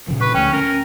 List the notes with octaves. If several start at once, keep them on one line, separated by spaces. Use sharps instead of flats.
A#2 C#3 F3
B4 C#6
D2 A3 C#4 G5
C#4 A#4